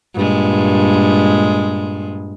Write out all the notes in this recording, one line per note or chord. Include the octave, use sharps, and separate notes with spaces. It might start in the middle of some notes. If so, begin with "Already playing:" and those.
G2 A#2 G#3